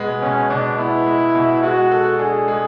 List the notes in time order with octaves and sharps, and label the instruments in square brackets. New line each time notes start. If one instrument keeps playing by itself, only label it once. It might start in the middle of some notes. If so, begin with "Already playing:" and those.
Already playing: [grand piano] B2 G#3 B3
[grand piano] B2 [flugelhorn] C#4
[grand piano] B2 [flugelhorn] D4
[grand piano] B3 [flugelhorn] E4
[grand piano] G#3
B2
[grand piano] G#3 [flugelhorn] F#4
[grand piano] A4
[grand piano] D4 [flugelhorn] G#4
[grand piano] G#3